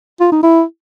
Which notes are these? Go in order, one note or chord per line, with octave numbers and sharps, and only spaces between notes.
F4
D#4
E4